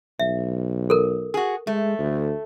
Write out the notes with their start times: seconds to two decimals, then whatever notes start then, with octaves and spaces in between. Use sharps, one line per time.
0.20 B1 E5
0.90 A4 A#4
1.34 F#4 G#4
1.67 G#3 A3
1.99 D2